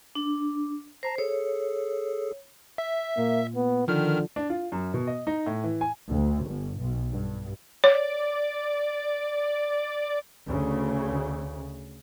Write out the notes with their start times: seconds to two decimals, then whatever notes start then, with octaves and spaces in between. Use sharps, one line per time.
0.15 D4
1.03 C5 A5 A#5 A#6
1.18 G#4 A4 C#5
2.78 E5
3.17 A#2 A#3
3.56 B3
3.88 D3 D#3 F3 F6
4.36 D4
4.50 F4
4.72 F#2
4.94 B2
5.07 D#5
5.27 D#4
5.46 A2
5.64 E3
5.81 G#5
6.09 D2
6.45 G1
6.79 B1
7.11 G2
7.84 C#5 D5
10.47 D2 C#3